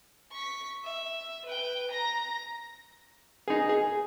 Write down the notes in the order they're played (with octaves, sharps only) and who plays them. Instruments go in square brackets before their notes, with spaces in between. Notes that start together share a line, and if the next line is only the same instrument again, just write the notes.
[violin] C#6 B6
E5
B4 G5
A#5 A#6
[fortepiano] D#4 G#4
G#4